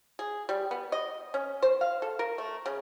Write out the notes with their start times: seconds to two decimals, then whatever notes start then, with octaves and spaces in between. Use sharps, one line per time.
0.19 G#4
0.49 G3
0.71 B3
0.92 D#5
1.34 C#4
1.62 C5
1.81 F5
2.02 A4
2.19 A#4
2.38 A3
2.66 C#3